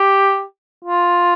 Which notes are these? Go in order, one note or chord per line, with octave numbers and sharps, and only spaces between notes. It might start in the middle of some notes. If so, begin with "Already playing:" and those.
Already playing: G4
F4